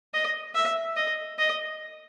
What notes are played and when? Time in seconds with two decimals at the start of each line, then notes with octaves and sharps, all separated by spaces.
0.14 D#5
0.55 E5
0.96 D#5
1.39 D#5